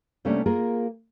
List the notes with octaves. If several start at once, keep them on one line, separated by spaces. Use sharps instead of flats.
C3 G3 A3 A#3 C#4 D4
A#3 F4 G#4 A#4